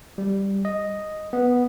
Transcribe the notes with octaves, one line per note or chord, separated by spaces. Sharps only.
G3
D#5
B3